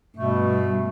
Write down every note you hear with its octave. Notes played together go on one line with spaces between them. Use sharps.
G2 B2 A3